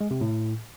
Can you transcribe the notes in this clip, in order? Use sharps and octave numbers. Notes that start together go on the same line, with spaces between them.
G#3
C3
A2